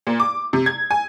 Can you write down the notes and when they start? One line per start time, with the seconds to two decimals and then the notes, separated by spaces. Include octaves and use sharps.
0.07 A#2
0.20 D6
0.53 C3
0.66 G#6
0.91 G#5